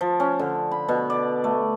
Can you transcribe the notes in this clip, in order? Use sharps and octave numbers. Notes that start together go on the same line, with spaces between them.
F3
C#4
D3
B5
B2
D5
A3